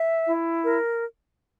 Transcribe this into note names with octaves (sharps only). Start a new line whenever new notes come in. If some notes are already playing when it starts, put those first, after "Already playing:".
Already playing: E5
E4
A#4